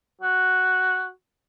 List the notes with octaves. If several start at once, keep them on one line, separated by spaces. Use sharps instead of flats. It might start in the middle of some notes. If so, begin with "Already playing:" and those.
F#4